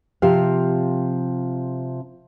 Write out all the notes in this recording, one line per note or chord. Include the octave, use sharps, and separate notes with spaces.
C3 F3 F4 G4 F5